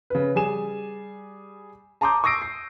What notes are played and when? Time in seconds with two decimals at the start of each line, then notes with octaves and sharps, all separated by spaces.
0.10 C#3 B4
0.35 G3 G#4 G#5 E7
2.01 A5 A#5 C6 D6 D#6 G6
2.24 C#6 D#6 E6 A#6 C7 D7
2.42 C7